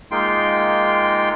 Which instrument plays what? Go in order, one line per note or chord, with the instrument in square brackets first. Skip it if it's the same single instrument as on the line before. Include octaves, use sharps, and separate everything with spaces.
[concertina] G#3 A#3 D#4 F4 G5 C6